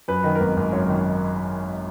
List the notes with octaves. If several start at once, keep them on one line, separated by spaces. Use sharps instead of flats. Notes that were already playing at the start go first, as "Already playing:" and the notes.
F#2 B4
D#3
A#4
G#1 B4
G#1
F#2 C#5
D#3